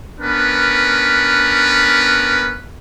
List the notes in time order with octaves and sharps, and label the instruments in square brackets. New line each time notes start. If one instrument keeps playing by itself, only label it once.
[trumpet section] B3 C#4 D4 A#4 B4